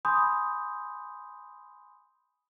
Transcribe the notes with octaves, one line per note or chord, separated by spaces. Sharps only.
G#5 B5 C6 D#6 G6